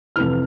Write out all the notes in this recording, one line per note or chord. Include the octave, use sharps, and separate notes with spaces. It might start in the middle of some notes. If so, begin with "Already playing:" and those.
F2 C3 E3 F6